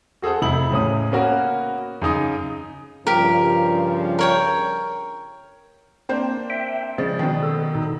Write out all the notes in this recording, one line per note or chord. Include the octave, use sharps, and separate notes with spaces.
F#4 G#4 A4 C5 F#5
F1 E4 B5 F#7
C#2 A2 C#4 D#6
A#3 B3 C#4 F#4 A#4
F#2 C#3 D#4 D#6
G2 C#3 F3 G4 A#4
A#4 C#5 G5
A#3 C4 D4 C5
E5 G5
C#3 F3 G#3 D5
B2 D#3
A4
A#2 D#4